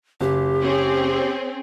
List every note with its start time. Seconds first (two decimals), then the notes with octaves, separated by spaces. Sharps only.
0.21 F#1 G4
0.61 C4 C#4 G#4